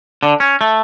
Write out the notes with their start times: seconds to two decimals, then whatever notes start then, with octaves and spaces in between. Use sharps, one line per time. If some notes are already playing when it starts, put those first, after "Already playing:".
0.23 D3
0.40 C#4
0.61 A3